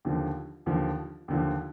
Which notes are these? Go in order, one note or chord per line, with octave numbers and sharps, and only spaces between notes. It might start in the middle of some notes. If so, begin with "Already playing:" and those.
D#2 D3 F3
D#2 D3 F3
D#2 D3 F3